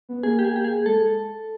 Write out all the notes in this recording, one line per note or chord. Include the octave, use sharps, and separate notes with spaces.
B3
A#3 G#4
G4
G#4
G4
G#4
G#3 A4